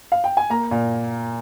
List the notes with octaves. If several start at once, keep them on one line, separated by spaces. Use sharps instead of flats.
F5
G5
G#5
A#3 A#5
A#2